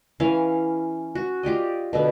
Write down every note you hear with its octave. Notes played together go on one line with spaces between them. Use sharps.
E3 C#4 F5
F#4
F4 G4 D5 D#5
B2 D3 B3